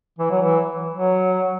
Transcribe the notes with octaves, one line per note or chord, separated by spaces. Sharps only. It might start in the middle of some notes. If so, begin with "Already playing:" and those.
E3
F#3
E3
F#3